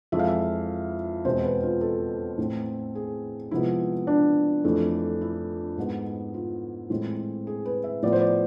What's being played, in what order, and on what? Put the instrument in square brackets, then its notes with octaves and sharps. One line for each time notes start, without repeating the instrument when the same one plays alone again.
[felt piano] F2 E3 G#3 E5
F5
E5
E2 B2 G#3 C4 C5
B4
F4
A4
A2 E3 A3 C4
G#4
C3 F3 G#3 B3 E4
D4
F2 E3 A3
E4
G#2 G#3 B3
F4
A2 E3 G#3 C4
G#4
B4
E5
A2 F3 B3 D5
C5
D5